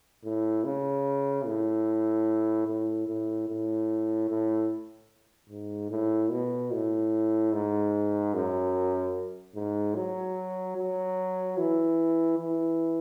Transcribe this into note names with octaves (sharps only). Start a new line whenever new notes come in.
A2
C#3
A2
A2
A2
A2
A2
G#2
A2
B2
A2
G#2
F#2
G#2
F#3
F#3
E3
E3